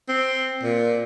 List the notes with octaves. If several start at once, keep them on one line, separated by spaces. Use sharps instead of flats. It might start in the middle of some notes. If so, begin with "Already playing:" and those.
C4
A#2